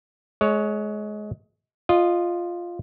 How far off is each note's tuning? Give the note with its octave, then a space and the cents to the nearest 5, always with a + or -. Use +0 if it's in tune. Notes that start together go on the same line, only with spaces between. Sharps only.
G#3 +25 C#5 +5
F4 +0 D#5 -15